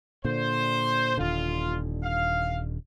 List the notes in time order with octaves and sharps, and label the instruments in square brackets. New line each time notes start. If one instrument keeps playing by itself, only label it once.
[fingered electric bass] A#2 D3 [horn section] C5
[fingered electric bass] D#1 D3 [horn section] F4
[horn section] F5